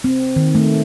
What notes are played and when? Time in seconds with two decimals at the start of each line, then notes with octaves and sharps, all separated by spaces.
0.04 C4
0.36 D#3
0.55 A3